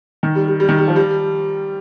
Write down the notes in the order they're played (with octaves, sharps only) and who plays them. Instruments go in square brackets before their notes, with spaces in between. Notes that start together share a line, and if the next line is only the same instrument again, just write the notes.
[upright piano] D#3
G3
G3
G3
D#3
G3
F3
G3